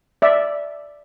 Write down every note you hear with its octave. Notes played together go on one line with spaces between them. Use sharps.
D5 E5